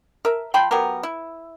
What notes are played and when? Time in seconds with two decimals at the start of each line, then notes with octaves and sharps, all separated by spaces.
0.25 A#4 E5
0.54 F3 G5 B5 C6
0.71 F#3 B3 G4 A#4
1.03 E4